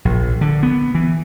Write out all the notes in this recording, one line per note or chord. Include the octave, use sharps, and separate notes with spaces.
A#1
D3
B3
E3